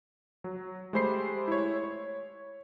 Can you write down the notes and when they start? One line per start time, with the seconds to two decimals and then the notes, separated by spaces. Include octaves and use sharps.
0.44 F#3
0.93 G#3 A3 G4 C5 B5 C7
1.48 E4 C#5
1.84 C#5